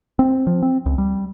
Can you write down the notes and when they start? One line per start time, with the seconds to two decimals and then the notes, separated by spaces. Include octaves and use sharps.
0.19 C4
0.47 F3
0.63 C4
0.86 C#2
0.98 G3